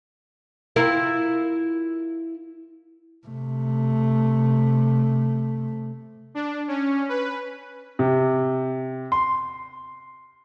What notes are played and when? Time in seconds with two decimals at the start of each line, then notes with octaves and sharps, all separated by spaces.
0.76 E4 F4 A#4
3.27 C3 A3
6.35 D4
6.68 C#4
7.09 B4
7.99 C3
9.12 C6